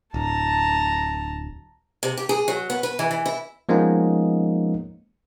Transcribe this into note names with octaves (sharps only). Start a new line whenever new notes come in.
D1 A5 A#5
C3
G4
G#4
F#3
B3
B4
E3
E3
E4
F3 G#3 A#3 B3 C#4 D#4